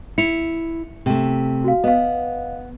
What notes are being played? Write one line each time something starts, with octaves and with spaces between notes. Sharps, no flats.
E4 C#7 F7
C3 A3
F#4 F5
B3 D#5 F5